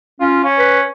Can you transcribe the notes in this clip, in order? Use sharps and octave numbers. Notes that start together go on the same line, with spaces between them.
C#4 F4
C#4
B4